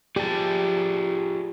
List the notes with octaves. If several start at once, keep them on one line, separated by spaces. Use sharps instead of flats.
F4 G4 G#4 D5 A5